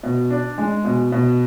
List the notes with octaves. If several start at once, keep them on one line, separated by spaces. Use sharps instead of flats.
B2
D4
G#3
B2
B2